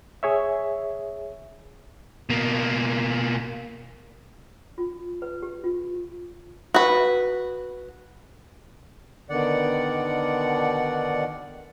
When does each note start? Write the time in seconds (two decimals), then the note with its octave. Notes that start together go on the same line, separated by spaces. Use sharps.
0.23 G#4 C#5 E5
2.30 B2 A#3
4.78 F4
5.22 B4
5.42 G4
5.64 F4
6.74 F#4 B4
9.30 B2 D3 D#3 D5 F#5